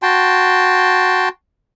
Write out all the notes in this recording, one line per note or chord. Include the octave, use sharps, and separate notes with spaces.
F#4 G5 A5 C6